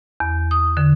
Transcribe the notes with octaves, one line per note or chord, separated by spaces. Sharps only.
E2
D#6
D3